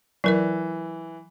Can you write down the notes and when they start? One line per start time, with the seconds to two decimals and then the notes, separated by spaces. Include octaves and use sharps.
0.24 E3 F#3 A#4 D5